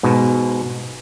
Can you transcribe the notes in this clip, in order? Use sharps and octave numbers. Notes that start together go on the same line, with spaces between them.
G#2 B2